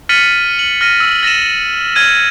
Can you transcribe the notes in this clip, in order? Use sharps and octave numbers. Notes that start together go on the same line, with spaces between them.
F6 A6 B6 C#7 D#7 F#7
F#7
F6 A#6 D#7
E6
A6 A#6 D#7 E7
F6 G#6 D#7